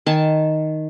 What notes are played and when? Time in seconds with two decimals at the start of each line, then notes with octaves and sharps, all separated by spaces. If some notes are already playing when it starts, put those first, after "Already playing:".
0.06 D#3 G#5 A5